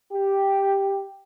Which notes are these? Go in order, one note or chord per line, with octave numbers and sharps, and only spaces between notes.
G4